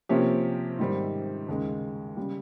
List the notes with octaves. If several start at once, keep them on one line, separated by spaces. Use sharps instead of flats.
C3 F3 A#3 C#4 G4
G#2 D#3 G3 C4
D#2 C#3 G#3
C#3 G3